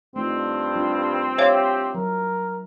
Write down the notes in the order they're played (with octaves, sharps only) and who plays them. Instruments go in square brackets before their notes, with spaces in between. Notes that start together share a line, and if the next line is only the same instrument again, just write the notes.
[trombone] G2 [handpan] A3 D#4 F4 [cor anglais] C4
[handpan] G3 D4 F4
[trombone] G4 [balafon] C5 C#5 F5 [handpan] E5
[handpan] F#3 [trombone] A#4